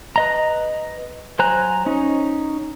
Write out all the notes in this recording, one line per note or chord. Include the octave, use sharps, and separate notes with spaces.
B4 D#5 A#5
F#3 C5 G#5 A#5 F#6
C#4 D#4